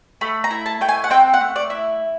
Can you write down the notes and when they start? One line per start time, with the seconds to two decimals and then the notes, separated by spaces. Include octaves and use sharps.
0.21 A3 B5
0.44 A#5
0.51 E4
0.66 A5
0.81 A3 G5
0.89 G#5
1.04 F#5
1.10 C4 G5
1.34 F#5
1.41 A3
1.56 D5
1.70 E4